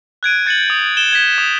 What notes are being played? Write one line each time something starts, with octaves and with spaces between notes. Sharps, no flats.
F#6 G#6 D7 D#7
G6 A6 C#7 D#7 F#7
D#6
E7 G7
G#6 B6
D#6